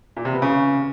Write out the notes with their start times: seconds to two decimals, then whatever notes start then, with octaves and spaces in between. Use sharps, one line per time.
0.17 A#2
0.25 C3
0.34 B3
0.42 C#3